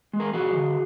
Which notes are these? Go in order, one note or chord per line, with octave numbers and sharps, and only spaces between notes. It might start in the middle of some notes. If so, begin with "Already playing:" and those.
G#3
G#4 A#4
F3 F#4 G#4
D3